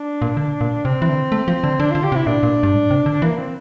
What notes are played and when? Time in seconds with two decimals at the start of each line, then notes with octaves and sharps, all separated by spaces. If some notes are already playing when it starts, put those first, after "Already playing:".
Already playing: D4
0.22 A#2
0.37 D3
0.61 A#2
0.84 C3 C4
1.02 E3
1.09 D3
1.32 A3
1.48 F3
1.64 D3
1.80 D3 D4
1.91 D3 F4
2.03 G4
2.12 C3
2.15 E4
2.27 A#2 D4
2.43 A#2
2.63 G2
2.75 A2
2.91 C3
3.06 D3
3.22 E3 A#3
3.38 C4